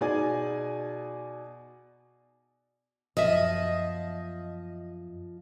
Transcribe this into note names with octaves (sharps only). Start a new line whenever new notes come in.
B2 D#4 G#4 D5 G#5
F#2 F3 B3 D#5 E5